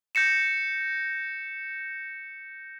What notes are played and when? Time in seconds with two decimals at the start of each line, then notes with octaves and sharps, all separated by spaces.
0.15 G6 A#6 C#7 E7